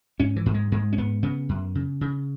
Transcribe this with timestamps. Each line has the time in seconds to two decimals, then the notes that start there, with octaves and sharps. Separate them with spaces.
0.19 G#2 C#4
0.36 E3
0.46 G#2
0.54 G#3
0.72 G#2 G#3
0.93 C#4
0.98 G#2 B3
1.23 C#3 B3
1.49 F#2
1.75 C#3
2.01 C#3